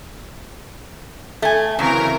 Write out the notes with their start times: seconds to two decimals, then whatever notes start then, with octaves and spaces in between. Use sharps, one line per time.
1.42 A3 G#5
1.79 C#3 E3 F#3 C4 A#4